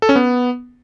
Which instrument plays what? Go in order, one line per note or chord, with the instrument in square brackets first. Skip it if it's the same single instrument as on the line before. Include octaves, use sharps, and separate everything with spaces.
[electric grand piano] A4
C#4
B3